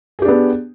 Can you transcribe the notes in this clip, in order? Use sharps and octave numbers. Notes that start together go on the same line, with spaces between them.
B3 D4 G4 G#4